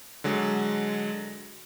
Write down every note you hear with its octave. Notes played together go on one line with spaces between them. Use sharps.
D3 F#3 G#3